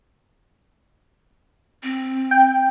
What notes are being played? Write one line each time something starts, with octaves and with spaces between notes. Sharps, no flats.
C4
G5